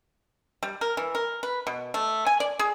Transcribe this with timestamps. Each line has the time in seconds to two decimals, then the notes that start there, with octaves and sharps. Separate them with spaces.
0.63 G3
0.81 A#4
0.97 E3
1.15 A#4
1.43 B4
1.67 B2
1.94 A3
2.26 G#5
2.40 D5
2.59 G#4